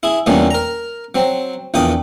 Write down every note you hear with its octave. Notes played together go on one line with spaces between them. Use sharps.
E4 G#4
E2 A#2 D3 G3 A#3 C#4
A#4 A#5
F#3 C4
A#1 E2 A#2 G5 D6 D#6